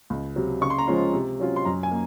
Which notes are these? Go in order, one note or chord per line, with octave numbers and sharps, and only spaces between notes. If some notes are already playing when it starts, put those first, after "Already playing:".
C#2
C3 F#3
C#3 C#6
C6
A#5
F3 G#3 C#4 F4 C6
C3
F#3 C#4 F4
C6
F#2 A#5
G#5
A#3